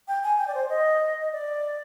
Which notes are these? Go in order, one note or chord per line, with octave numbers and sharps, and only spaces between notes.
G5
G#5
G5
D5
C5
D#5
D#5
D5